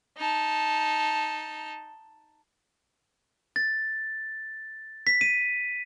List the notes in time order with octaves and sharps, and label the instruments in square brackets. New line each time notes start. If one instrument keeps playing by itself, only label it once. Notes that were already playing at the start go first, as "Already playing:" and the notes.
[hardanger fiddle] D#4 A5
[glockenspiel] A6
B6
D#7